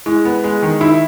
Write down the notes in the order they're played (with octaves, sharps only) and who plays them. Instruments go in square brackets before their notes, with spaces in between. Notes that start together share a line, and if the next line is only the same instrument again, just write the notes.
[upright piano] G#3 [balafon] E4
[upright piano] B3
G#3
D#3
[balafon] D#4 [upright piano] E4